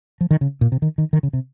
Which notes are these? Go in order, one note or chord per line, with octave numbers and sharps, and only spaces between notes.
F3
D#3
C#3
A#2
C3
D#3
D#3
D#3
C#3
C3